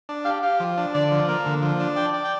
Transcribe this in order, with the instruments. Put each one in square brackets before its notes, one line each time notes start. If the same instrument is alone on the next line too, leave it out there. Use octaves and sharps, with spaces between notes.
[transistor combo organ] D4
[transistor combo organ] G4 [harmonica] F5
[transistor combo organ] G4 [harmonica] F5
[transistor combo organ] F3
D4
[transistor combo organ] D3 [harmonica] D5
[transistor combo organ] F3
A#3
D3
F3
D4
[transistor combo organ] D5 [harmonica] G5
[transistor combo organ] D5
[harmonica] G5